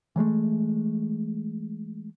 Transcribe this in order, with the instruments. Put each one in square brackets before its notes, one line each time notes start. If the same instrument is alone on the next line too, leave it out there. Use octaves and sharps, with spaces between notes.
[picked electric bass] E3 F#3 G#3 A3